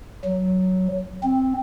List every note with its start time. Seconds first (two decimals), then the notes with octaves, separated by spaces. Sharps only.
0.25 F#3
1.23 C4